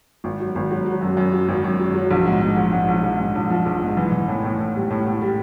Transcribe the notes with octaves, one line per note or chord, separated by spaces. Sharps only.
G#1
F#3
G#1
F#3
F#3
F#2
F#2
F#3
G#1
F#2
F#3
F#3
A#1
G#2
G#2
A#1
G#2
A#1
A#1
G#2
A#1
F3
A#1
G#2
E3
E3
A2
A2
A2
G3
A2
A2
G3